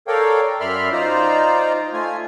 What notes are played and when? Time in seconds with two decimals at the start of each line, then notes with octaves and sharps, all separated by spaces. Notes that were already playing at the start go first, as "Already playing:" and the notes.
0.08 A4 A#4 C#5 D5 F5 G5
0.60 F#2 D5 E5 B5 C6 F6
0.92 D#4 F4 C5 D5 A#5
1.93 A3 F4 G#5